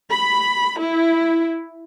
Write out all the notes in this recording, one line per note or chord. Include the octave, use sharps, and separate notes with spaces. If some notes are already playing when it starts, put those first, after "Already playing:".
B5
E4